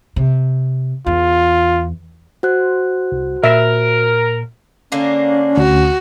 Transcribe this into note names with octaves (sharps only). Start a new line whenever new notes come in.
C3
E2 F4
F#4 C5 F#6
C2
A#2 A#4 E5
D3 A#3 C#4 D4
D2 F#4